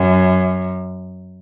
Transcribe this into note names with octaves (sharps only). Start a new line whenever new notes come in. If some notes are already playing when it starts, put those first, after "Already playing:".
Already playing: F#2